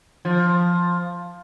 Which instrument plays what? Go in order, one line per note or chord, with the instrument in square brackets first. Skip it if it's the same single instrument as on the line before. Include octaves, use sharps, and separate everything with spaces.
[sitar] F3